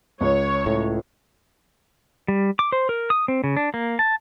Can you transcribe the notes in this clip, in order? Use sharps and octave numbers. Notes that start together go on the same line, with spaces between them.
C#2 C#5
A2
G3
D6
C5
A#4
D#6
C4
C#3
D4
A#3
A5